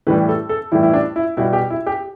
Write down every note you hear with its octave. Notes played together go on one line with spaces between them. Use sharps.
A2 E3 G3 B4
A4
A4
A2 E3 G3 E4
E4
D4
E4
B2 G3 E4
G4
E4
G4